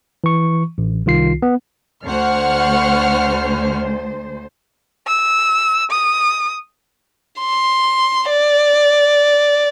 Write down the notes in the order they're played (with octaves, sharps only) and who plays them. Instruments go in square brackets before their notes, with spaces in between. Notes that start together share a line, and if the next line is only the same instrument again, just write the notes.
[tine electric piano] E3 C#6
A1
C2 D#3 F4 C7
B3
[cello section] D2 C5 [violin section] F#5 C#6 F6
[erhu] E6
D#6
[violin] C6
D5